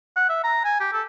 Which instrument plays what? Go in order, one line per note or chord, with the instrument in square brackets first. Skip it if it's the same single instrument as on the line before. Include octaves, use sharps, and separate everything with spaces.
[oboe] F#5
E5
A#5
G#5
G4
A4